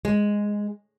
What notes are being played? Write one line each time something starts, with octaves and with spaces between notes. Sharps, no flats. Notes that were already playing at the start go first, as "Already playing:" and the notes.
G#3